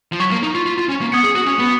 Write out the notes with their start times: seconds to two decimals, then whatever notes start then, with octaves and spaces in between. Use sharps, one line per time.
0.12 F3
0.20 F#3 C#6 G#6 B6
0.32 A#3
0.43 D#4
0.55 F4
0.66 F4
0.78 F4
0.89 C#4
1.01 A#3
1.12 B3 D#6 G#6 C#7
1.24 G#4
1.36 F#4
1.47 C#4
1.59 B3